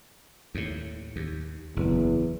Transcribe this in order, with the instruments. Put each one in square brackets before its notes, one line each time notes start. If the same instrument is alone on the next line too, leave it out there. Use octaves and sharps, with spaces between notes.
[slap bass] D#2 A2
D#2
[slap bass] F#1 [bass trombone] E2